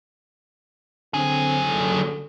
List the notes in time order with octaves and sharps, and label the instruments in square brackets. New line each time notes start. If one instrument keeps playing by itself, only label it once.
[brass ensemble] D3 C4 [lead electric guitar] F#3 G#4
[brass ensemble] C#2 D3